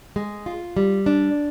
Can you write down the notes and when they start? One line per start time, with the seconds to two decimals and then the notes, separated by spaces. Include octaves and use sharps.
0.16 G#3
0.46 F4
0.77 G3
1.06 D4